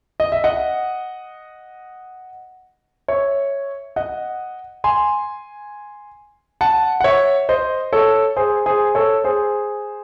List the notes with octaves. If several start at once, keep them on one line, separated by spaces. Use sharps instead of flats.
D#5
E5
D#5 F#5
C#5 E5
D#5 F#5
G#5 C6
F#5 A5
F#5
C#5 E5
C5 D#5
A4 C#5
G#4 C5
G#4 C5
A4 C#5
G#4 C5